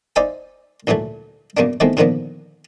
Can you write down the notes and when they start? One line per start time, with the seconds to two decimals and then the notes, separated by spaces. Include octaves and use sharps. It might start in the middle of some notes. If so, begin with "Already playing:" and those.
0.16 D#4 C5 D5 E5 G#5
0.87 D2 A#2 E3 F#3 A3
1.57 F#2 C#3 A#3 B3 D4
1.80 D#3 E3 G#3 A3 B3 C4
1.97 A#2 D3 D#3 F3 A#3 B3